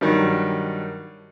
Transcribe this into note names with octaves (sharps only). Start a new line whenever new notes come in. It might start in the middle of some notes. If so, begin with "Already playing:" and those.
G2 D#3 F#3 G3